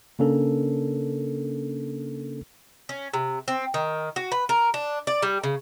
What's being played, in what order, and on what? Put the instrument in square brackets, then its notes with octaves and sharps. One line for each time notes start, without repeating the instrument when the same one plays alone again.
[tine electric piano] C#3 A#3 C#4 D4 A4 A#4
[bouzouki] C#4
C3
C4
D#3
F#4
B4
A#4
D4
D5
G3
C#3